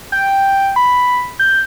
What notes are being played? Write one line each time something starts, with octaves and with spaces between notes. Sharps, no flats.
G5
B5
G6